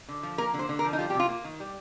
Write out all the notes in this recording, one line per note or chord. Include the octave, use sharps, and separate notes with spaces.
D3
F3
A#3 A#4
D3
C5
D3
A#4
F3
D#4
G3 F4
G4
C3
F4
A#3
D#3
G3